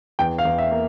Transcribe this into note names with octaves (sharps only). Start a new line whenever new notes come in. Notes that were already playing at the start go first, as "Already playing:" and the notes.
E2 G5
F5
E2
E5
A#3